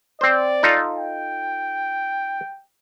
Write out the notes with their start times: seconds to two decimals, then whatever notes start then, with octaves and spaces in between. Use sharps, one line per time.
0.21 C4 C5 D5
0.63 D#4 F4 A4
0.97 G5